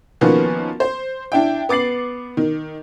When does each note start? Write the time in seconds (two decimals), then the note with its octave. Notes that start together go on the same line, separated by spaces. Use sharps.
0.21 D#3 F3 A#3 B3 C#4 F#4
0.80 C5
1.32 D4 E4 G5
1.69 B3 D6 A6 C7 F#7
2.37 D#3